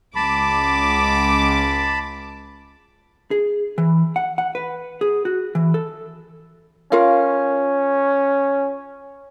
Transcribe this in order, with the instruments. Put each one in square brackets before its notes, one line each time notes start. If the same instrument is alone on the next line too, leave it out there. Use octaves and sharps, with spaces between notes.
[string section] C#2 D6 [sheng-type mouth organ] A5 B5
[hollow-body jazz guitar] G#4
E3
F#5
F#5
B4
G#4
F#4
E3
A4
[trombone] C#4 [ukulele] F4 A#4 F5